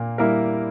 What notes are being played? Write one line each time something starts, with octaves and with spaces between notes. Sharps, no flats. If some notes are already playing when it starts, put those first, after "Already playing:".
Already playing: A#2 A#3
G3 A#3 E4 A#4